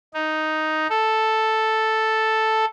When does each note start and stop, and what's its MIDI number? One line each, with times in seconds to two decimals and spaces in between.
0.14 0.87 63
0.90 2.65 69